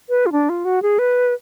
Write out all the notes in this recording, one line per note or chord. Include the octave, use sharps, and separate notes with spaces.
B4
F4
D4
F4
F#4
G#4
B4